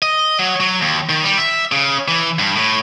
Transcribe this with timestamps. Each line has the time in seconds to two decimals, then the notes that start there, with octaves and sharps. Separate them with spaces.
0.02 D#5
0.39 F#3
0.60 F#3
0.82 D#2
1.09 D#3
1.24 G3
1.38 E5
1.72 C#3
2.08 E3
2.39 G2
2.56 A2